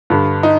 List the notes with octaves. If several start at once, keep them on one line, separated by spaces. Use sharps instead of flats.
G2 D3
D#4